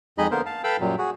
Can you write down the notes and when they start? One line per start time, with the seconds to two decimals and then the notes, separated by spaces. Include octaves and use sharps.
0.18 F2 G#3 D#4 G#4 D#5 B5
0.31 D3 A#3 B3 A#4 C5
0.46 F5 A5
0.64 A4 B4 F5 G5 B5 E6
0.80 F#2 A#2 F#3 G3
0.98 F#4 G#4